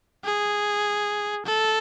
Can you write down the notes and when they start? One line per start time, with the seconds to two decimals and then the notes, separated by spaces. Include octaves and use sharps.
0.24 G#4
1.45 A4